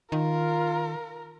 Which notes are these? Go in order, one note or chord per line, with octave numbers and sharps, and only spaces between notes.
D#3 F4 A#4